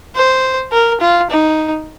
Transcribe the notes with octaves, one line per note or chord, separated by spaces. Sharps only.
C5
A#4
F4
D#4